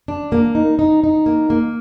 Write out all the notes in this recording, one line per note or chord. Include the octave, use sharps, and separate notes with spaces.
D4
A#3
D#4
D#4
D#4
A#3
A#3